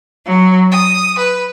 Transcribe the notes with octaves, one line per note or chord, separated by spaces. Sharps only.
F#3
D#6
B4